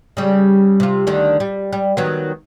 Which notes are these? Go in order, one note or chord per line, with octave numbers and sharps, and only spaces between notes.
C#3 G3
C3 F4
D2 D3 D#3
G3
G3
D#3 F#3 B3